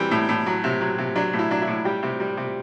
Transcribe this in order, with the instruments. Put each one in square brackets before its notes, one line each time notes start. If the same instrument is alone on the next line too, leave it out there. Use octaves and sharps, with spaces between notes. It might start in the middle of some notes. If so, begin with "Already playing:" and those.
Already playing: [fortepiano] E3 G3 C4
A2
A2
F#3
C3
F#3
C3
F#3 D4
A2
E4
F#3 D4
E4
A2
G3 G4
C3
G3
C3